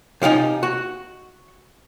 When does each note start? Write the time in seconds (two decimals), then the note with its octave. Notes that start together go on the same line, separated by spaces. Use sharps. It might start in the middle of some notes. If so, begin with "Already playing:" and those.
0.22 C3 F3 F#3 D#4 G#5
0.63 F#4